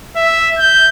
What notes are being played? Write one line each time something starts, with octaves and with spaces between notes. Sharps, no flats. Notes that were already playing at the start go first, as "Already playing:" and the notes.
E5
G6